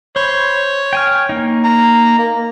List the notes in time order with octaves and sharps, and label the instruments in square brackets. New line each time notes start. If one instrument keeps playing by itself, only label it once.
[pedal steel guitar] C5 B5 [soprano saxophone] C#5
[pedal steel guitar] G5 G#5 F6
A#3 D#4
[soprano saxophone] A#5
A#3